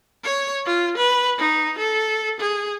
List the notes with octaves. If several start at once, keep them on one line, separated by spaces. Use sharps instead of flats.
C#5
F4
B4
D#4
A4
G#4